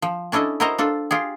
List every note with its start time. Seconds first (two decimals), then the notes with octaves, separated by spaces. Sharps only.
0.02 F3
0.32 C#4 D4 E4 A4 D#5
0.60 E4 F#4 A#4 C5 D#5 A#5
0.78 D4 F4 A4
1.11 F4 G4 G#4